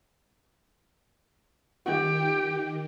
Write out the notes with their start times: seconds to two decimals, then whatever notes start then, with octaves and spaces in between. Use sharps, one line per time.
1.86 D#3 G4